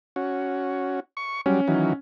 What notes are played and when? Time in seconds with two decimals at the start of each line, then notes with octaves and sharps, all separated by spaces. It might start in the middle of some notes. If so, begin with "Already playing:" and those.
0.16 C#4 F#4
1.17 C#6
1.46 F#3 G3 C#4
1.68 D#3 E3 F#3